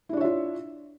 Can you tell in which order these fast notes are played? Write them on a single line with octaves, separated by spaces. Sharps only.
E4 D4 C#5 E5 F4